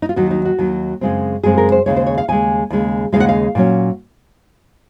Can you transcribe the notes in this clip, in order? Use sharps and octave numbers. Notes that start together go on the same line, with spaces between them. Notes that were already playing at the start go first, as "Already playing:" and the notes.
D#4
F4
D#2 D#3 F#3 F#4
D#4
F#4
D#2 D#3 F#3
F#2 C#3 G#3 C4
F#2 C#3 G#3 C4 G#4
A#4
C5
D#2 C#3 G#3 C#5
C5
C#5
F5
D#2 C#3 G#3 G#5
D#2 C#3 G#3
D#2 C#3 G#3 F5
F#5
F5
A#2 F#3 C#4